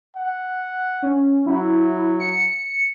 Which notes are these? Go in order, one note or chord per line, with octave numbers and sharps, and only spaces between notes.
F#5
C#4
F#3 E4
C#7